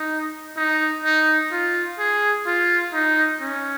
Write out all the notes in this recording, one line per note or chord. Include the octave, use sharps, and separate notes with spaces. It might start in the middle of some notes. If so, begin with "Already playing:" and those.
Already playing: D#4
D#4
D#4
F4
G#4
F4
D#4
C#4